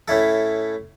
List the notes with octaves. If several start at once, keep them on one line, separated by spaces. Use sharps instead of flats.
A2 C#4 E4 A4